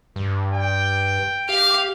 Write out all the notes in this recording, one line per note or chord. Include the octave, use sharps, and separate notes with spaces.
G2
G5
G4 F5